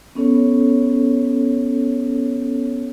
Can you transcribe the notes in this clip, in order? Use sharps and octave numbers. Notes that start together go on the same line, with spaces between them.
B3 C#4 A4 C#5